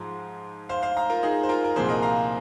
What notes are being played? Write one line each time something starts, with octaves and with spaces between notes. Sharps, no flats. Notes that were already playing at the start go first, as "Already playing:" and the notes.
Already playing: G#2 F3 G#3 A#5
C5 F5
C5 F5
F5 A#5
F4 A#4
D#4 G#4
C5
F4 A#4
A#4
C2 A#2 F3 G#4 C5
A#4 D#5
F5 A#5